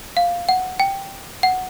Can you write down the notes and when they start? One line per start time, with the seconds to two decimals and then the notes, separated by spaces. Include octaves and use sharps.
0.17 F5
0.49 F#5
0.80 G5
1.43 F#5